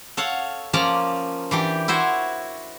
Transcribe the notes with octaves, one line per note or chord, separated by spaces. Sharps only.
A4 C#5 F5 F#5
F3 A#3 C#4 D5 A5 A#5
E3 D4 G4
E4 F#4 C5 C#5